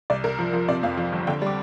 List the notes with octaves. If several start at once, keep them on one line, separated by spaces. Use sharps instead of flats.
C2 D5
C2 A#4
F3
F3
C3 D5
F2 F5
F3
G1
D3 G5
G3 D6